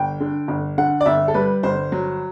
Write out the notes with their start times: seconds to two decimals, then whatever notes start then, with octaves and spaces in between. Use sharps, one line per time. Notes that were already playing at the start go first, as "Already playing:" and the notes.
Already playing: G1 G5
0.20 D3
0.48 G1
0.78 D3 F#5
1.00 D5
1.06 G1 E5
1.28 A4
1.34 G3 B4
1.63 G1 C5
1.92 F#3